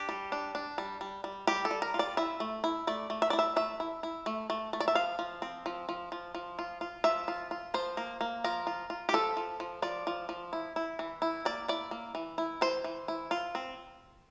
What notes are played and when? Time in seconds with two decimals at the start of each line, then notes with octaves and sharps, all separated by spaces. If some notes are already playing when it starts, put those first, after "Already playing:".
Already playing: D4 G4
0.09 G3
0.32 D4
0.55 D4
0.78 G3
1.01 G3
1.24 G3
1.47 G3 G4
1.65 A4
1.71 G3
1.82 A#4
1.94 F4
1.99 D5
2.17 E4 E5
2.40 A3
2.64 E4
2.87 A3 D5
3.10 A3
3.22 E5
3.30 E4 D5
3.39 E5
3.56 A3 E5
3.80 E4
4.03 E4
4.26 A3
4.50 A3
4.73 A3
4.80 D5
4.88 E5
4.95 F3 F5
5.19 F3
5.42 C4
5.66 F3
5.89 F3
6.12 F3
6.34 F3
6.59 F4
6.81 F4
7.04 F3 E5
7.28 F4
7.51 F4
7.74 F3 C5
7.97 A#3
8.21 A#3
8.44 F3 A#4
8.67 F4
8.90 F4
9.09 G4
9.13 F3 A4
9.37 F3
9.60 F3
9.82 F3 D5
10.07 F3
10.29 F3
10.53 E4
10.76 E4
10.99 E3
11.22 E4
11.45 A#3 D5
11.68 E4 D5
11.91 A#3
12.15 E3
12.38 E4
12.61 E3 C5
12.84 E3
13.08 E4
13.31 F4
13.55 C4